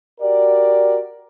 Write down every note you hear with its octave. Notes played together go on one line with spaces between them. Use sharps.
F#4 G4 A#4 D5